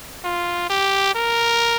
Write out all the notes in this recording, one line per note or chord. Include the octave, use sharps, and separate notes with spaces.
F4
G4
A#4